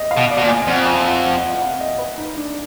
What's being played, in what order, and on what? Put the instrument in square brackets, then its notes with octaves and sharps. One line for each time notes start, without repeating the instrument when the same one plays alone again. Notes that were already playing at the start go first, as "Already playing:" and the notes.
Already playing: [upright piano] D#5
F5
[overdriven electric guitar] B2
[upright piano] D5
[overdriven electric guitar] B2
A#2
[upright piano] G#5
[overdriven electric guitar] F2 [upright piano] F#5
[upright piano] G#5
F#5
F#5
F#5
F#5
F5
D#5
B4
D#4
D4